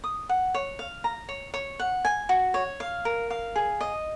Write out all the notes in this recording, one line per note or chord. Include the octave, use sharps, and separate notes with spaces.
D#6
F#5
C#5
F5
A#5
C#5
C#5
F#5
G#5
F#4
C#5
F5
A#4
F5
G#4
D#5